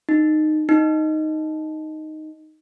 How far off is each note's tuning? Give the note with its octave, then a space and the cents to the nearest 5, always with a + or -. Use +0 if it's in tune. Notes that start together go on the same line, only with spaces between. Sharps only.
D#4 -15
D#4 +0